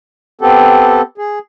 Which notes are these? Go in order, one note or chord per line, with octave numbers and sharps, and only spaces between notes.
B3 C4 G4 A4
G#4